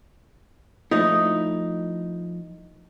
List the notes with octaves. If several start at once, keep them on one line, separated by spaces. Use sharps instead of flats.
F3 A3 D#4 E4